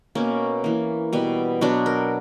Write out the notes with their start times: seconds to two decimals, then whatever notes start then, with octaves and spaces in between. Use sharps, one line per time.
0.15 B2 A#3 C#4
0.64 E3 A#3
1.13 B2 G3 B3
1.61 B2 F#3 B3 D4
1.86 A#4